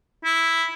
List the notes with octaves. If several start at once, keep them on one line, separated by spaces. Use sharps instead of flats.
E4